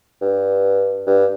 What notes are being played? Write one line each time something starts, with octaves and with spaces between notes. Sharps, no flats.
G2
G2